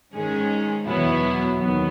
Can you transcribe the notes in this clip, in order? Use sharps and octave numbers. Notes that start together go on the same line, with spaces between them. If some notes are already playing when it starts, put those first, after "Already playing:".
G#2 D#3 G#3 C#4 G#4
E2 B2 F#3 B3 E4
D#2 D#3 F#3 B3